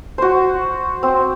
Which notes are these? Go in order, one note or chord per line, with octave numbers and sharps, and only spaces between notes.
F#4 C5
C4